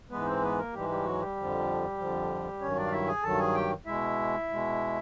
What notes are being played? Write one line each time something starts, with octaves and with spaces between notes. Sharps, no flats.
G#2 E3 G#3 B3 B4
C4 C5
B3 B4
A#3 A#4
G#2 E3 G3 G#3 G4
G3 G4
F#3 F#4
G3 G4
F2 D3 F3
F2 D3 F3
G2 D#3 F#3 C#4 C#5
D4 D5
F5
E4 E5
G#4 G#5
G2 D#3 F#3 A4 A5
G#4 G#5
G4 G5
B2 G#3 E4 E5
B2 G#3